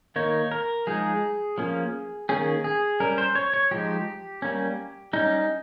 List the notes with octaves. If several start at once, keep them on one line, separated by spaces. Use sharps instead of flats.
D#3 A#3 D#4 C#5
A#4
F3 G#3 D#4 G#4
F3 A#3 C#4
D#3 A#3 C#4 G#4
G#4
G3 C#4 A#4
C5
C#5
C#5
F3 G#3 D#4 G4
G3 A#3 C#4
G3 C#4 D#4